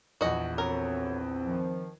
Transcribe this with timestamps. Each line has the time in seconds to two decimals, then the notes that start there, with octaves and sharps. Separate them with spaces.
0.21 A#1 E2 F#4 D#5
0.58 C4 F#4 A4 A#4 C#5
1.46 D#3 F3